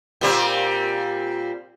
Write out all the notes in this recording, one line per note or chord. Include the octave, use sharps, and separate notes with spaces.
A#2 G3 C4